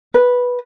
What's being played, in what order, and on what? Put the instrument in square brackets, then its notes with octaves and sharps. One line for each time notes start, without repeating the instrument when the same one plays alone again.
[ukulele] B4